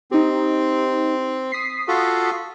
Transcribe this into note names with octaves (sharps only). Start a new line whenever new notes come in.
C4 D#4 G4
D#6 B6 C7
F4 F#4 A4